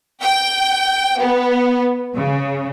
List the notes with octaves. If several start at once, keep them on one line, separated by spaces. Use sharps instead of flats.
G5
B3
C#3